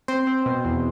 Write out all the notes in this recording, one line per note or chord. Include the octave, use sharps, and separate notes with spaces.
C4 C5
C4
B2
E2